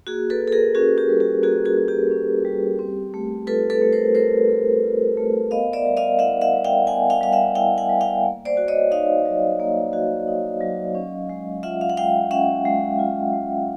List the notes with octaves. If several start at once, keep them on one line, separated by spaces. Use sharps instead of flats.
A#3 F#4 G#4
A4 B4
F#4
A4
G#4 A#4
C#4 F#4 G#4
G4
G3
G4
A#3 F#4 G#4
F#4 G#4
F#4
G4
C#4
G3
C4
A3
F4 A4 B4
A4 B4
A3
A#4 C5
C4 A#4 C5
A3
F4
A3
B3 D#5 F5
D5 E5
G3
D#5 F5
E4 E5 F#5
E5 F#5
G3
F5 G5
B3 F#5 G#5
F5 G5
G3 F5
E5 F#5
E4 F5 G5
F#5 G#5
G3
F5 G5
A#3
C5 D5
F#4
C#5 D#5
D#4 D#5 F5
F#3
A#3
F#4
D#4
F#3
C#4
G#3
F4 E5 F#5
F5
F#5
G#3 F5 G5
C#4 E5 F#5
G#3
F4
G#3